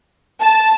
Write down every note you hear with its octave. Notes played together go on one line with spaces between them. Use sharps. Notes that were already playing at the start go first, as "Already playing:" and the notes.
A5